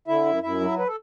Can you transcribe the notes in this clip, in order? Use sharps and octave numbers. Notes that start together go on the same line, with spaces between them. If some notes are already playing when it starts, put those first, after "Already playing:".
D3 E4 E5
F#2
F#2 E4 E5
F#3
B4
A4